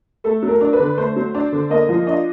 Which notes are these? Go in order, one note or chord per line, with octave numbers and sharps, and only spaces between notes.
A3 A4
F#3
A#4
D4
B4
D3
A3 C5
F#3
D4
D3
A#3 D#5
F3
D4 D#5